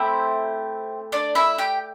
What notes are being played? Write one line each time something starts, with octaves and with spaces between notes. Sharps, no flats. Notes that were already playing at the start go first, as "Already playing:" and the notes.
Already playing: A3 C4 E4 G4 C5
D4 D5
E4 E5
G4 G5